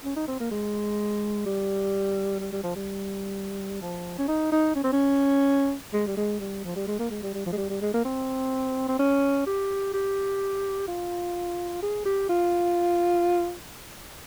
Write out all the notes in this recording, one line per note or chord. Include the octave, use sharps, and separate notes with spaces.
C#4
D#4
C4
A#3
G#3
G3
G3
G3
F3
G3
F3
C#4
D#4
D#4
C#4
C4
C#4
G#3
G3
G#3
G3
F3
G3
G#3
A#3
G#3
G3
G3
F3
G#3
G3
G3
G#3
A#3
C4
C4
C#4
G4
G4
F4
G#4
G4
F4